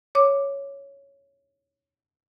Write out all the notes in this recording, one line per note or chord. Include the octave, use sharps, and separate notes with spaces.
C#5 D6